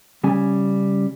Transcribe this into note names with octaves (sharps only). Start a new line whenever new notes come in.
C#3 G3 C#4 G#5